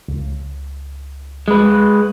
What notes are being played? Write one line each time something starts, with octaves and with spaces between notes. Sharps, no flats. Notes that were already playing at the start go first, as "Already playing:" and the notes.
C#2
G#3 B4